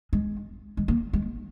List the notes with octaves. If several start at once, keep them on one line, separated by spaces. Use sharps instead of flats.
G#3
G#3
A#3
G#3